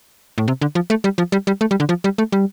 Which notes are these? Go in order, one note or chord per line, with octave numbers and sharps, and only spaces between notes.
A2
C3
D3
F3
A3
G3
F3
G3
G3
A3
G3
D3
F3
G3
A3
G3